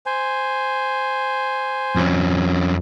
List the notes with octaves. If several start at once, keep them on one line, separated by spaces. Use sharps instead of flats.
C5 G#5
F2 C#4